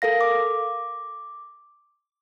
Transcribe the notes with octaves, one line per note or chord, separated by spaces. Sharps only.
A4 A#4 F5 A#6
D6